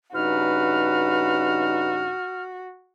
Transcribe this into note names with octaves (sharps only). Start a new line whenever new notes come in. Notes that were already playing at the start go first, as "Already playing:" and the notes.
G2 C#3 D#4 F#4 B4 F6